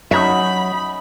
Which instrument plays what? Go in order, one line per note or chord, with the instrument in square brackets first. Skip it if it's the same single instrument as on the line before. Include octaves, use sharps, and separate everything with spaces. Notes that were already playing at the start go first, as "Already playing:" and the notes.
[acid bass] F#3 [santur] C#4 D#4 [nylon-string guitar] E5 [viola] B5